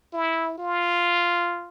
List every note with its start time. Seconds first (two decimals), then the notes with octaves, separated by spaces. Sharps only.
0.13 E4
0.58 F4